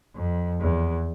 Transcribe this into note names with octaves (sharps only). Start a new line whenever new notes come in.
F2
E2